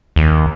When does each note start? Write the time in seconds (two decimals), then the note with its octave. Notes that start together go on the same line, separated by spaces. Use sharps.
0.16 D#2